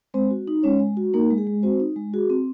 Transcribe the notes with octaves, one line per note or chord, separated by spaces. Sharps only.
G#3 C4 C5
F#4
D#4
G#3 C#4 C#5
G#3
F#4
A#3 D#4 A#4
G#3
G#4
G#3
C4 F#4 C5
D#4
G#3
F#4 G#4
C4